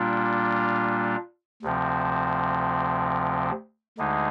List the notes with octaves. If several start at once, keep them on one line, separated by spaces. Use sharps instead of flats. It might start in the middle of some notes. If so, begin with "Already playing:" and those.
Already playing: A#2 G3 A#3 D4 F4
D2 C3 F3 C4
D2 D3 G#3 D#4